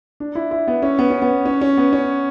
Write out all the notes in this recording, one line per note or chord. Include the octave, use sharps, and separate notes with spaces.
D4
E4
E4
B3
C#4
B3
C#4
B3
C#4
C#4
B3
C#4